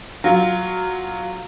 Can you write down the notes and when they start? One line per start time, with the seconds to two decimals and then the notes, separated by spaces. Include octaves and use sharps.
0.24 F#3 F4